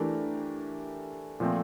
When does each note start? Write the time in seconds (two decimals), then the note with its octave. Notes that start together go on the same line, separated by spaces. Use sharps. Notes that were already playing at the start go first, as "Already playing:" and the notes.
Already playing: E3 A3 D4 G4 A#4
1.40 A#2 F3 A3 C4